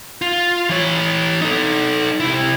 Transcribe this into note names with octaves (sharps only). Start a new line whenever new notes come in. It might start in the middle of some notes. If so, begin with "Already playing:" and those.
F4
E3 C#5
D#4 A4
C3 E4